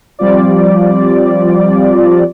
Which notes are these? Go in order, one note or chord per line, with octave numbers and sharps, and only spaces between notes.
F3 G3 C4 F4 D5